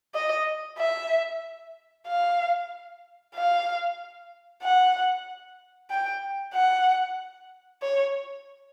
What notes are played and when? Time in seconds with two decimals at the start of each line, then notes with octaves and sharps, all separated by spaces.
0.15 D#5
0.79 E5
2.07 F5
3.35 F5
4.62 F#5
5.91 G5
6.54 F#5
7.83 C#5